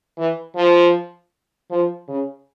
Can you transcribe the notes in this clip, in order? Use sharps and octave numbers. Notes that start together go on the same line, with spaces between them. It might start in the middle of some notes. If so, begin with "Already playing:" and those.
E3
F3
F3
C#3